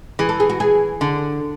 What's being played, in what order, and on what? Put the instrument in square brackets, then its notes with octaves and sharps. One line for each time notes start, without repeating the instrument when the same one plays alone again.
[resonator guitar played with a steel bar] E3 [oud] G#4
[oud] A4
G#4
F#4
G#4
[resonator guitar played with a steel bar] D3